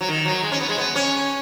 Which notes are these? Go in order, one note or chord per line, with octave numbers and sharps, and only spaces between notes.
F#3
D#3
F#3
G#3
C#4
B3
G#3
B3
C#4